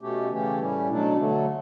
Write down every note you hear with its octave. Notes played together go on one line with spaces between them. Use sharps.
B2 A3 C#4 G4
C#3 E3 A3 C#4 G4
A2 G3 C#4
B2 F#3 A3 D4
D3 F#3 A3